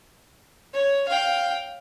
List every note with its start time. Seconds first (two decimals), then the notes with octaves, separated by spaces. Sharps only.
0.73 C#5
1.08 F5 G5